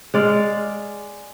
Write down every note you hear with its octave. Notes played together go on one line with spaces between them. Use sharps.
G#3 D5 F5